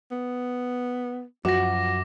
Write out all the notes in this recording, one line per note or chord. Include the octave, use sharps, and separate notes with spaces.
B3
F#2 F3 F#4 D6 A#6